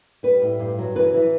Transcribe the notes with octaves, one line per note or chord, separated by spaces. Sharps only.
G3 B4
A2
G2
F#3
E3 B4
E3